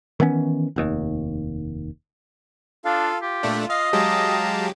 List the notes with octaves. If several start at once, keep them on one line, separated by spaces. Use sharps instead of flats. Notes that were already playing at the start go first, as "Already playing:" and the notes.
D#3 E3 B3 C#4
F1 D#2
D4 F4 A4 F5
F4 G4
A#2 A3 D4
D#5 F5
F#3 G#3 G4 F5 A5 A#5